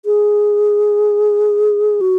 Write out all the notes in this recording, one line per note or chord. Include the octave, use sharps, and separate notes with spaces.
G#4
F#4